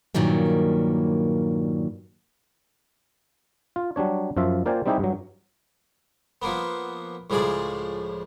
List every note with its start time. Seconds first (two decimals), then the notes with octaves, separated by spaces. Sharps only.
0.15 G2 A#2 D#3 F#3 G3 A#3
3.76 F4
3.96 F#3 G3 D4 C#5
4.37 F#2 F3 F4 E5
4.66 A#3 F4 C5 D5 G5 G#5
4.86 G3 C4 D#4 E4 G4 G#4
4.99 G2 F#3
6.42 F3 A#3 B3
7.30 C#2 A2 F3 G#4 D5